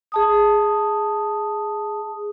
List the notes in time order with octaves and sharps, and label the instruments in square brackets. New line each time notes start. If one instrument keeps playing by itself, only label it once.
[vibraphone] G#4 A5 D#6